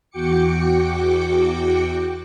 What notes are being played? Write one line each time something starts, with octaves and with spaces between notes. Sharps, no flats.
E2 F#4 G5 D6 C#7